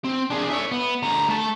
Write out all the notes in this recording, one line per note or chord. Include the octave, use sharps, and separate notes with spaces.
C4
D4 G#4
C#5 E5
B3
D2 A#5
A3 A5